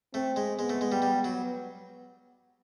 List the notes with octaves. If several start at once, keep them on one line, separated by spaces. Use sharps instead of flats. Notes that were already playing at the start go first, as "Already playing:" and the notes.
A3 C4
G#3
G#3 B3
A3
G#3
G3
G3
F#3